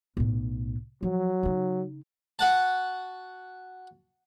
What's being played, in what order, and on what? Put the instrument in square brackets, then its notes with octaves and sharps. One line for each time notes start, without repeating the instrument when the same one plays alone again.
[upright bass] B1 A2
[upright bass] F3 [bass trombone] F#3
[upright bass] C#3 D#4
[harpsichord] F#4 F#5 A5